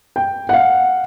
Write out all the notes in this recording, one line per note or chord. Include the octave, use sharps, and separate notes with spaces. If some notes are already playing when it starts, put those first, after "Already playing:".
G5
F5 F#5